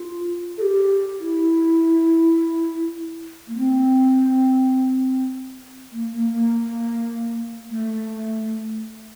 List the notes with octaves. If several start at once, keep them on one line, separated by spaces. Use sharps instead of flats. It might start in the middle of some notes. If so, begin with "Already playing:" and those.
Already playing: F4
A4
G4
E4
A#3
C4
A#3
A#3
A#3
A3